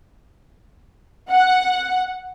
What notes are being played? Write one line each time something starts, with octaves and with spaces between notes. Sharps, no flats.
F#5